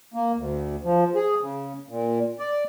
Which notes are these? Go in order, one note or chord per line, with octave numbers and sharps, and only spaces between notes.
A#3
D2
F3
G#4
C#3
A#2
D5